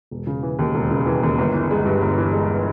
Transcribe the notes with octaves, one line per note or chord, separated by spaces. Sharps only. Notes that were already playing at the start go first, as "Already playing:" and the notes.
E1
C#3
E3
D#2
E1
C#3
E3
D#2
G1
E3
G#3
G2
G1
E3
G#3